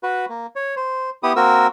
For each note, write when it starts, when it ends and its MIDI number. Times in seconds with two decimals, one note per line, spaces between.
0.03 0.25 66
0.03 0.25 71
0.29 0.46 58
0.56 0.75 73
0.76 1.10 72
1.23 1.33 59
1.23 1.33 64
1.23 1.33 67
1.23 1.33 87
1.36 1.67 58
1.36 1.67 60
1.36 1.67 66
1.36 1.67 70
1.36 1.67 88